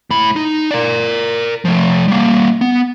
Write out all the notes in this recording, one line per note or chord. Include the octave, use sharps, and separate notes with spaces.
A2 B5
D#4
A#4 D5
F3 A3
G3 A#3
B3